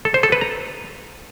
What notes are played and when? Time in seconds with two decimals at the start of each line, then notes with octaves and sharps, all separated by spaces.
0.05 A4
0.14 C5
0.23 A4
0.32 B4
0.41 A#5